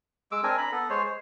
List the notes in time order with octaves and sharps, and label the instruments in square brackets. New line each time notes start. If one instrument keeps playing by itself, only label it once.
[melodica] G#3 D6 E6
C4 D4 A#4 G#5
A#5 B5
B3 A4
G#3 C5 C#5
C5